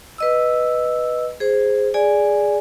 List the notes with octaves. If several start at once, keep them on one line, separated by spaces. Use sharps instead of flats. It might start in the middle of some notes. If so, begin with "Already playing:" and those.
B4 D#5 E6
G#4 C5
G#4 D5 G#5